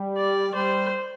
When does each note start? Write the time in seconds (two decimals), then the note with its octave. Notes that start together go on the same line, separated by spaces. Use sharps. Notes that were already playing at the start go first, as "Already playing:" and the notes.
Already playing: G3
0.17 D5
0.54 G3 C5